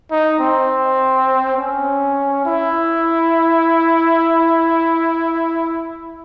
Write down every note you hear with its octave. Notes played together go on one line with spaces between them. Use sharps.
D#4
C4
C#4
E4